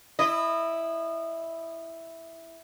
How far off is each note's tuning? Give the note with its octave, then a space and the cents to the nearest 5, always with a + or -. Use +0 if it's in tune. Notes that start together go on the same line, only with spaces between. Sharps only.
E4 +0 D#5 -25